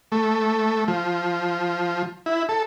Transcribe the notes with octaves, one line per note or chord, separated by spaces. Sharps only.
A3
F3
E4
A4